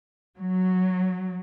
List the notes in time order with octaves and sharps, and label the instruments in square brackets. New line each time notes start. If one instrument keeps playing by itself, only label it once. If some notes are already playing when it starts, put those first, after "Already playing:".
[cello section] F#3